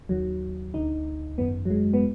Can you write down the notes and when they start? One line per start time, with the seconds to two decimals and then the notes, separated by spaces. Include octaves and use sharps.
0.09 D#2 D#3 F#3
0.74 D2 D3 D#4
1.38 G#1 F#2 D#3 B3
1.65 F#3
1.70 G#3
1.93 B3